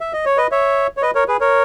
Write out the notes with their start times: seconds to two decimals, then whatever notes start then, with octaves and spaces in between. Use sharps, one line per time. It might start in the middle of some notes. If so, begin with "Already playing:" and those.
0.01 E5
0.13 D#5
0.26 C#5
0.37 B4 D#5
0.52 C#5 E5
0.97 C#5
1.02 B4 D#5
1.15 A#4 C#5
1.28 G#4 B4
1.40 A#4 C#5